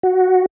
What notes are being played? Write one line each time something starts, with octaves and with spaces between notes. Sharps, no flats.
F#4